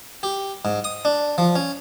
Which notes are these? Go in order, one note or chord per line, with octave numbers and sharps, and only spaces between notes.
G4
G#2
D#6
D4
F3
C#4